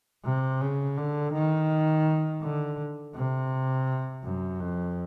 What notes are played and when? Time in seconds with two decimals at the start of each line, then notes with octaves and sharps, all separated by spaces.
0.24 C3
0.61 C#3
0.97 D3
1.33 D#3
2.42 D3
3.15 C3
4.23 F#2
4.60 F2